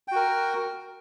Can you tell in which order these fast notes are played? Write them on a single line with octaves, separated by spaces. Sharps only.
G5 F#4 A#4